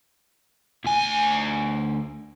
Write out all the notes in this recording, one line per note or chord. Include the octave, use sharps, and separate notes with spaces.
D2 G#5